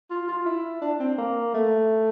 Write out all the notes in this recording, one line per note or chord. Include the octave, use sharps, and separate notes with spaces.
F4
F4
E4
D4
C4
A#3
A3